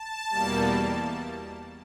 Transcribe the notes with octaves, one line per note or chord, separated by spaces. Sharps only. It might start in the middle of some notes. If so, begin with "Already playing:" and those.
Already playing: A5
E2 B2 G3 A#3